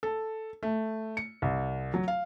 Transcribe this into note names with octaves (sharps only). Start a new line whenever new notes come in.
A4
A3
C#7
C2
F#3
F5